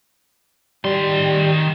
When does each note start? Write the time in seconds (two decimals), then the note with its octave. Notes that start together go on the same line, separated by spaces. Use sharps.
0.85 D#3 G3 C6